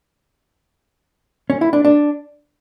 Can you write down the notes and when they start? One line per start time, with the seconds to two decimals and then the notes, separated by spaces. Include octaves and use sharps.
1.50 C#4
1.61 E4
1.73 D4
1.85 D4